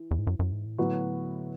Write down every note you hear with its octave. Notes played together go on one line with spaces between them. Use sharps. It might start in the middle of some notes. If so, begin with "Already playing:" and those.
Already playing: E3
E2
G#2
F#2
F#2
G#2
A2
A2 D3 F#3 B3 F#4 B4